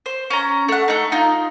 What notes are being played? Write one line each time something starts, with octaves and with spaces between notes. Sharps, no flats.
C5
C#4 A#5
A3 F#5
A3 D#4
D#4 F4